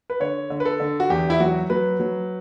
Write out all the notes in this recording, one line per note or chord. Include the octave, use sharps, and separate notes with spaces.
B4
D3 C#5
D3
B4
A4
D3
F#4
E2 G4
E4
F#3 F#4
F#3 B4
F#3